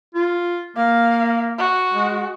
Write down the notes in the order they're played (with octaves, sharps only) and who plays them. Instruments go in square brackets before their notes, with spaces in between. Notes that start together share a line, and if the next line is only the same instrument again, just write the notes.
[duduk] F4
[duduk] A#3 [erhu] F5
[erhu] F#4
[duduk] G#3